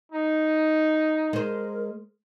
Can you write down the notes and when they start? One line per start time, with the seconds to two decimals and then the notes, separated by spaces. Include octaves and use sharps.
0.12 D#4
1.33 G#3 A#4 C5